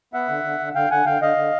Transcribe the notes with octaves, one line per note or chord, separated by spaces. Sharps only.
B3 E5 F#5
D3
D3
D3
D3 F5 G5
D3 F#5 G#5
D3 F5 G5
D3 D#5 F5
D3